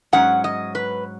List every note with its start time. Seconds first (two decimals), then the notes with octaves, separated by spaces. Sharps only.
0.13 G#2 F#3 C#4 F#5
0.44 D#5
0.75 B4